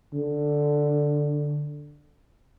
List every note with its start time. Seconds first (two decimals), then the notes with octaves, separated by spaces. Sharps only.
0.13 D3